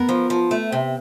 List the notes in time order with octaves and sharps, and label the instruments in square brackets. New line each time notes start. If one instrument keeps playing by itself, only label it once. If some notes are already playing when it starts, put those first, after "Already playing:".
Already playing: [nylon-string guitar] B3 [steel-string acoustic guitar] A#4
[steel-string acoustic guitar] F3
F3
A3
C3